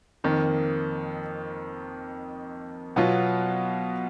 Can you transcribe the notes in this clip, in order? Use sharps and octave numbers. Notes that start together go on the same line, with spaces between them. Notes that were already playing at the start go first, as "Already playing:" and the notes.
F2 D#3 A#3
B2 F#3 B3 F4